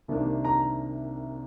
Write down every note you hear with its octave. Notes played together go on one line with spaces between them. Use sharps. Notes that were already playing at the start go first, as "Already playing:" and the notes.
C2 C3 D#3 A#3 D4
A#5